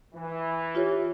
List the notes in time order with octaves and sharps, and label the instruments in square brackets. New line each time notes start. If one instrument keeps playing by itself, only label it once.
[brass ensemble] E3
[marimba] F4 G4 C#5